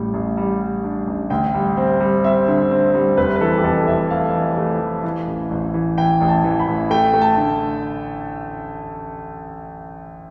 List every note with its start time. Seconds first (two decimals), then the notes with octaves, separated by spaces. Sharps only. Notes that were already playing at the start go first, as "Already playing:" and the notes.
Already playing: A1 A2 G3
0.14 A1
0.37 G3
0.61 G3
0.84 D4
1.07 A1
1.30 D2 G5
1.54 G3
1.77 C4
2.00 G3
2.24 C4 E5
2.48 D3
2.71 C4
2.94 G3
3.17 F1 B4
3.36 B4
3.41 E3 A4
3.58 G4
3.64 F2 A4
3.87 F1 E5
4.11 A3 F5
4.34 E3
4.57 A3
4.81 E3
5.04 E3
5.27 A1
5.51 A1
5.74 E3
5.98 E3 G5
6.21 A1
6.28 A5
6.44 E3
6.59 B5
6.67 A1
6.91 A3 G5
7.13 A3
7.22 A5
7.37 D3